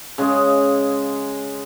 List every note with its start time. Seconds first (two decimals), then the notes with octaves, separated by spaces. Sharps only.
0.18 C#3 G#3 D#5